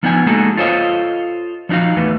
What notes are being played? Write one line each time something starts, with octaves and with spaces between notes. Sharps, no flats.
F3 B3 D4 D#4 D#5 G#5
G#3 A#3 D#4 F#4 G#4 A4
F4 A4 C5 C#5 D#5 F5
F3 D4 D#4 F#4 F5
E2 E3 A3 B4